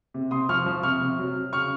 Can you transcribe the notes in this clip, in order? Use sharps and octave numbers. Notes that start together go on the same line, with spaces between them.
C3
C3 C6 D#6
F3 C#6 F6
F3
C3 C#6 F6
C3
F#3
F#3
C#3 C#6 F6